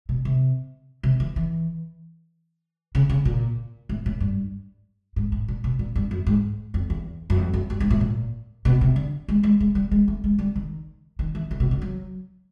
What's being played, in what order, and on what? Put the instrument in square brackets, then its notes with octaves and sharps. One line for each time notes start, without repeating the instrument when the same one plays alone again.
[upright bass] B2
C3
C3
E3
E3
C#3
C#3
A#2
A2
A2
G2
G#2
A2
A#2
B2
A#2
G2
F#2
G#2
F2
E2
F#2
F2
F#2
G2
G#2
A2
A#2
B2
C3
D3
G#3
G#3
G#3
G3
G#3
A3
G#3
G3
D#3
D#3
E3
E3
B2
D3
F#3